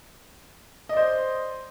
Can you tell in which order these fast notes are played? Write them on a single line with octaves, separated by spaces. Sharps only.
D#5 D5 C5